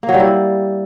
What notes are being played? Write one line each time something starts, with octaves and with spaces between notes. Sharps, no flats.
A#3
F#3
G3
E4